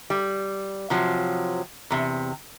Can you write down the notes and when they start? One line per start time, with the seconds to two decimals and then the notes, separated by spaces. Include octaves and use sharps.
0.10 G3
0.90 C3 F3 F#3
1.90 E2 C3